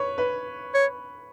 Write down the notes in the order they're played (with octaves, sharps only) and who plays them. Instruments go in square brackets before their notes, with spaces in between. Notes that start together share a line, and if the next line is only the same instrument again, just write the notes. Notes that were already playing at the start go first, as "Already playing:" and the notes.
Already playing: [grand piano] B4 C#5
B4
[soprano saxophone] C#5